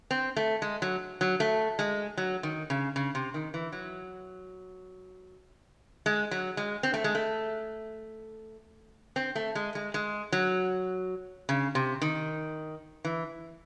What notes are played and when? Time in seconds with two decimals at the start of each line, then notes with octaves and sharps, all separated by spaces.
0.11 C4
0.37 A3
0.62 G#3
0.82 F#3
1.21 F#3
1.40 A3
1.79 G#3
2.17 F#3
2.43 D#3
2.70 C#3
2.96 C#3
3.15 C3
3.34 D#3
3.54 E3
3.72 F#3
6.06 G#3
6.31 F#3
6.57 G#3
6.83 C4
6.94 A3
7.04 G#3
7.15 A3
9.16 C4
9.36 A3
9.55 G#3
9.75 G#3
9.94 G#3
10.32 F#3
11.49 C#3
11.75 C3
12.02 D#3
13.05 E3